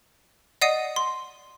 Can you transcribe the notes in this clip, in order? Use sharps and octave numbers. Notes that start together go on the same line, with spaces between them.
D5 D#5 F#5 D#6 C7 D#7
C6